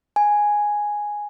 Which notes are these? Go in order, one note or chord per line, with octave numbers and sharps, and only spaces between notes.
G#5